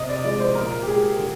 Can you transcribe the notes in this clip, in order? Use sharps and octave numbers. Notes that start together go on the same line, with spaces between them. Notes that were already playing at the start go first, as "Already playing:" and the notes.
Already playing: C3 D#5
D5
F3 G#3 D5
C5
A#2 A#4
G4
G#3 G#4
D3